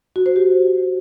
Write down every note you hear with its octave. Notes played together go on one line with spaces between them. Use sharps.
F#4
C5
G4